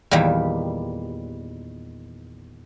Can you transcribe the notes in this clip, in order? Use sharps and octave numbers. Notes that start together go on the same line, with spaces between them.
E2 A#2 D#3 G3